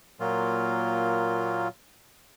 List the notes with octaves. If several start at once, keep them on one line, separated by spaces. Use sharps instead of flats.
A#2 F#3 A#3 F4